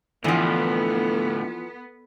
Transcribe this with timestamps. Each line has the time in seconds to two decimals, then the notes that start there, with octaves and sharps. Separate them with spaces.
0.24 D2 A2 D3 E3 F3 B3